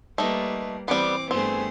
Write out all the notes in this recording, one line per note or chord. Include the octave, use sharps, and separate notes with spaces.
G3 A3 A#3 D#4 B4
E3 G3 B3 C4 D6
G2 A3 B3 C4 G#4 C5